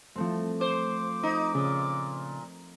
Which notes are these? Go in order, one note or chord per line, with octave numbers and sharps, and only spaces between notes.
F3 A3 C4
C5 D6
D#4
A#2 C#3